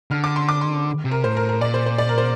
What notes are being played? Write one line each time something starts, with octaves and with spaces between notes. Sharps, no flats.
D3 F6
D6
C6
D6
C6
C3
A#4
A2 C5
A#4
A#4
A#2 D5
C5
C5
D5
A#4
C5